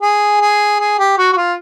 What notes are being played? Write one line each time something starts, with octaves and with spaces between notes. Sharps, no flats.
G#4
G#4
G#4
G4
F#4
F#4
F4